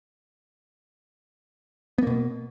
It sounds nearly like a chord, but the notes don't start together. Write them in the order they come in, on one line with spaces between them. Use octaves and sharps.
B3 A#3 B2